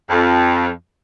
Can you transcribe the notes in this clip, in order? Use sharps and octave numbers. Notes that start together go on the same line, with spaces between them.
F2